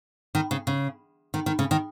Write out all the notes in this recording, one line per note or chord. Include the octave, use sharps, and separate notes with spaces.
D#3
C#3
C#3
D#3
D#3
C#3
D#3